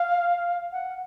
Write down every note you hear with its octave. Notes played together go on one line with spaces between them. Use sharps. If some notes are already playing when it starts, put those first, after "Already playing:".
Already playing: F5
F#5